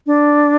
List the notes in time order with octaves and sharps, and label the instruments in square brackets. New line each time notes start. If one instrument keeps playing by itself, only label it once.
[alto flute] D4